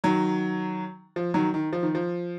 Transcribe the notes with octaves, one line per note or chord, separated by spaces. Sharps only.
D#3 F#3
F3
D#3 F#3
D#3
F3
D#3
F3